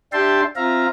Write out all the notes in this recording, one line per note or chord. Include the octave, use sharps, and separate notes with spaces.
D4 G4 E5 G5 A5 C6
C4 F4 E5 F5 A#5